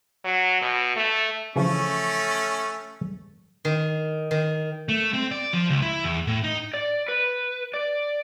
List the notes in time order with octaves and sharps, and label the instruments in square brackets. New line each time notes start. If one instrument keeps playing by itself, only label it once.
[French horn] F#3
B2
A3
[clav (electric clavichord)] C#3 E3 F3 [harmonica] A3 C#4
[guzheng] D#3
D#3
[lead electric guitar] A3
C4
D5
F3
C#2
E4
E2
A2
D#4
[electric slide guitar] D5
B4
D5